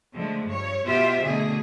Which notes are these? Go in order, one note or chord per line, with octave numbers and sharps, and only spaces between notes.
D3 F3 G#3 A3
G2 C#5
B2 F4 G4 C5 E5
B2 D3 A3 G#4